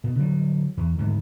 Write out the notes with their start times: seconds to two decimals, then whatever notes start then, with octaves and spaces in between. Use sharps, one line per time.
0.04 B2
0.19 D3 F#3 G3
0.77 E2
0.98 D2 G#2 D#3